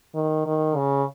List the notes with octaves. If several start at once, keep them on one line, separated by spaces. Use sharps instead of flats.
D#3
D#3
C#3